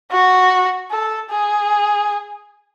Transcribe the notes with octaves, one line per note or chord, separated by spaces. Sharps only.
F#4
A4
G#4